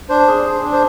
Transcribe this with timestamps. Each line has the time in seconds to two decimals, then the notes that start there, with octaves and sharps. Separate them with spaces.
0.09 D4 C5
0.28 G#4
0.46 G#4
0.64 D4
0.72 C5